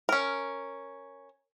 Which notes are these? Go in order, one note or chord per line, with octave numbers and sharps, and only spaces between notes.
C#4 A#4